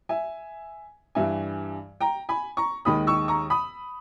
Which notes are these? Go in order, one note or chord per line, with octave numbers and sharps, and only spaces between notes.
E5 G#5
G2 E3 G3 E5 G#5
G5 A#5
G#5 B5
A#5 C#6
D#2 D#3 G#3 B5 D#6
C#6 E6
A#5 C#6
B5 D#6